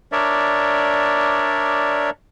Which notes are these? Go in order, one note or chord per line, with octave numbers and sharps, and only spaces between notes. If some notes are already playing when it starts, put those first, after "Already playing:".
D4 A#4 C#5 D5 E5